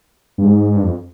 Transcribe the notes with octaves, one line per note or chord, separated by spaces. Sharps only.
G2
G#2
G2
F2